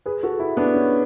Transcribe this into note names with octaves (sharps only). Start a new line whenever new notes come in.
G#4 B4
F#4 A4
E4 G#4
B3 D4
C#4